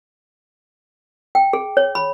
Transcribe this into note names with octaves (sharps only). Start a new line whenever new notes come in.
G5
G#4
C#5
B5